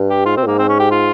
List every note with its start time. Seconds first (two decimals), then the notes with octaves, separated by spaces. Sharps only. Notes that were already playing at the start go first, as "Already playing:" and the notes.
Already playing: G2
0.10 G4
0.26 G#2 F4
0.37 C3 C4
0.43 A#2
0.47 G#2 A#3
0.59 C4
0.69 C#4
0.80 G4
0.91 F4